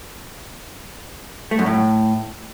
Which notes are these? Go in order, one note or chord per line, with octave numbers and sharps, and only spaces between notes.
A3
F#2
A2